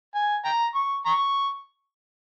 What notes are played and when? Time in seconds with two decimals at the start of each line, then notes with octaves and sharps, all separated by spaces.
0.15 G#5
0.45 G5 A#5
0.75 C#6
1.06 A#5 C#6